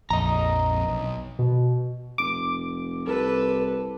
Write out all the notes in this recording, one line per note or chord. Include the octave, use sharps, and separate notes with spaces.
A#1 F2 D#5 A#5
B1
B2
F1 D6
C2 A4 B4